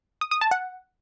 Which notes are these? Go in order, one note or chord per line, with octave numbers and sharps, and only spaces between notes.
D#6
D#6
A5
F#5